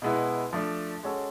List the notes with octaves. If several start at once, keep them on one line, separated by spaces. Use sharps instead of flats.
B2 G#3 B3 E4
F3 A3 D4
G#3 C#4 F#4 A4